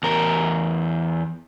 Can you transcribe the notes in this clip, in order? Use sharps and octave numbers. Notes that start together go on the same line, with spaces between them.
E2 A#4